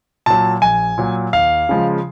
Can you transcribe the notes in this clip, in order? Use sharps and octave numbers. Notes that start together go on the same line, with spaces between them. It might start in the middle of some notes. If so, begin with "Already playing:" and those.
A#2 F#3 A5
A#1 G#5
A#2 F#3
D#2 F5
C#3 F3 G#3